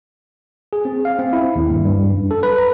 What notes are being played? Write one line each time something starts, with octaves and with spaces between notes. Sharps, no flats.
G#4
C4
F5
C4
E4
D#2
G2
G2
F#2
A4
B4
A#5